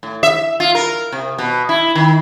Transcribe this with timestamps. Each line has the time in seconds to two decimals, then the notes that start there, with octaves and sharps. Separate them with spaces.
0.03 A2
0.23 E5
0.60 F4
0.75 A#4
1.12 C3
1.39 B2
1.69 E4
1.95 D#3